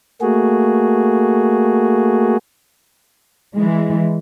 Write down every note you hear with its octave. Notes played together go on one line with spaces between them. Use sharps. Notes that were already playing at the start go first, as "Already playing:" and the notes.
A3 A#3 F#4 G#4
E3 G#3